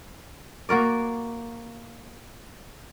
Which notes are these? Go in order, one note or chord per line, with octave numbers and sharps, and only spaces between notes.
A#3 F#4 A#4 D5